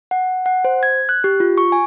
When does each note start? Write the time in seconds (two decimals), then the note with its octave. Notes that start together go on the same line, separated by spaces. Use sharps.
0.11 F#5
0.46 F#5
0.65 C5
0.83 G#6
1.09 F#6
1.24 G4
1.40 F4
1.58 C#6
1.72 G#5